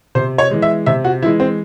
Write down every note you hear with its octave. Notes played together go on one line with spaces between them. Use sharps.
C3 C5
C#5
E3 G#3
E5
C3 E5
F#4
E3 G#3 E4
C4